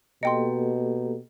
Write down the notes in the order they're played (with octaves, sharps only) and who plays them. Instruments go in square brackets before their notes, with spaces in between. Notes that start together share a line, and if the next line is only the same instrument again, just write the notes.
[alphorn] B2 [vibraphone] A#3 G4 A4 [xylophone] D#5 G5 C6